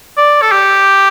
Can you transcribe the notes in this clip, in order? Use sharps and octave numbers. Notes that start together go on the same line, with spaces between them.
D5
A4
G4